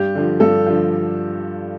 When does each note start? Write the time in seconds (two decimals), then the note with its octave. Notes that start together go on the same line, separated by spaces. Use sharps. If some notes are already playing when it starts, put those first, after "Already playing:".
Already playing: G2 G4
0.15 D3 F3
0.40 G2 A4
0.67 D3 F3